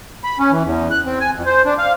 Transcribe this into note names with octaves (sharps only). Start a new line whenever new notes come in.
B5
C#4
E3
E2
F#6
C4
G#5
F2
C5
D4
F5